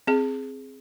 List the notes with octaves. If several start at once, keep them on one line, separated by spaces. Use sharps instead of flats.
C4 G#4